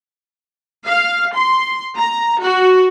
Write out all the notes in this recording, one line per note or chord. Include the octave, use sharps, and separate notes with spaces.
F5
C6
A#5
F#4